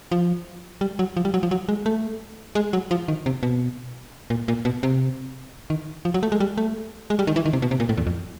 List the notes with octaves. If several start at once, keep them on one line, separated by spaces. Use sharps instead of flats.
F3
G3
F#3
F3
G3
F#3
F3
F#3
G#3
A3
G#3
F#3
F3
D#3
C3
B2
A#2
A#2
B2
C3
D#3
F3
F#3
A3
G#3
G3
A3
G#3
G3
D#3
E3
D#3
C3
B2
C3
A#2
A2
E2
F2